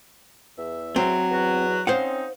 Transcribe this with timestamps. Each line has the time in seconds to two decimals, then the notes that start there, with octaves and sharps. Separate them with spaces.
0.58 E2 E5
0.96 F#3 C4
1.31 E2 B3 F#4
1.87 C4 C#4 D#4 C5 F5 F#5